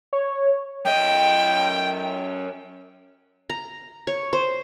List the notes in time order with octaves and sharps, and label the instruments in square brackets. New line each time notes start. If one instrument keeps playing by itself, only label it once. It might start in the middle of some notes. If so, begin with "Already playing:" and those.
[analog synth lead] C#5
[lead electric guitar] F#2 D#5 [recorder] G5
[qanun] A#5
C#5
C5